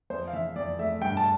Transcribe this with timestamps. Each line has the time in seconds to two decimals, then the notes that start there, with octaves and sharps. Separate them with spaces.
0.10 F2 C5
0.28 F5
0.33 E3 E5
0.56 F2 D5
0.79 A3 E5
1.02 G2 G5
1.17 A5